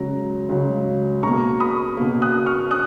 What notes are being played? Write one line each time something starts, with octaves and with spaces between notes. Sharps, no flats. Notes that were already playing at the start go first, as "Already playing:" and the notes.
Already playing: C#2 C#3 F#3 A#5
C#2 C#3 F#3
B2 A#3 A#5 C#6
B5 D#6
B2 A#3
D#6 F#6
C#6 F6
D#6 F#6